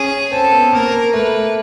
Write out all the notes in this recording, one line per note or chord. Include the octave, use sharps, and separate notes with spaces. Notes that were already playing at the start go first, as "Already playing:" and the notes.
Already playing: C#4 G#4
C4 A4
B3
A#3 A#4
A3 B4